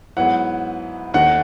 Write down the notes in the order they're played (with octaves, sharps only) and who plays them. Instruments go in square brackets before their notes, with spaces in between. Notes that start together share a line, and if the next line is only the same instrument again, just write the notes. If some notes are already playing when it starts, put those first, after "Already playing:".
[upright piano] G#2 F#3 B3 E4 [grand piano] F#5
[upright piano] D#2 D#3 A3 D#4 [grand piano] F#5